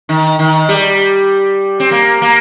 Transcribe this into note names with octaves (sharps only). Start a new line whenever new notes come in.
D#3
D#3
G3
C4
A#3
A#3